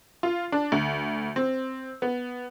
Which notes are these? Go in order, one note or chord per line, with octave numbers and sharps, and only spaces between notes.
F4
D4
D2
C4
B3